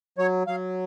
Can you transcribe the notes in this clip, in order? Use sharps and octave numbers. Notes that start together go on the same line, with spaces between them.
F#3 C#5
F#3 F5